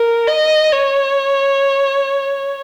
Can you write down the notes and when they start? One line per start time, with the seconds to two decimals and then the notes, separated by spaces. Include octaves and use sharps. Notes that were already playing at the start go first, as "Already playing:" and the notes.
Already playing: A#4
0.27 D#5
0.72 C#5